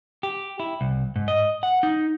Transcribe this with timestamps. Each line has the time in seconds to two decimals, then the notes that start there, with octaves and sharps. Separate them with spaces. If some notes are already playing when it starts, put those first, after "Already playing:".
0.23 G4
0.60 E4
0.81 C2
1.16 G#2
1.28 D#5
1.63 F#5
1.83 D#4